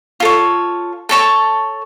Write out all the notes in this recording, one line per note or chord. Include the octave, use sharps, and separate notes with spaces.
F4 A4 C#5
A4 C#5 A5 C#6